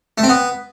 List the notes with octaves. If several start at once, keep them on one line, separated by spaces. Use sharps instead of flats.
A3
C4
B3